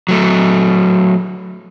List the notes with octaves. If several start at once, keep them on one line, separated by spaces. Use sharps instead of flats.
F#3 A3